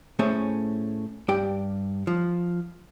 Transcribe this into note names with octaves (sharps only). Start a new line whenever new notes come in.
A2 A3 C#4 G#4 C5 C#5
G2 G4 D5 G5
F3